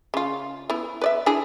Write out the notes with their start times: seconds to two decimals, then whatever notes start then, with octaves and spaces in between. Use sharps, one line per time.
0.14 C#3 F4
0.70 B3 E4
1.01 B4 D5 E5
1.26 D4 E4 G#4